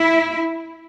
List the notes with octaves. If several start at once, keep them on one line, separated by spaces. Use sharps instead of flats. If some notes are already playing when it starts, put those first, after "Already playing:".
Already playing: E4